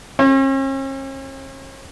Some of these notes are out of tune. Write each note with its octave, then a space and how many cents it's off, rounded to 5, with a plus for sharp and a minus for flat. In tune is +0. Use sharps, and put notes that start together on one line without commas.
C#4 -45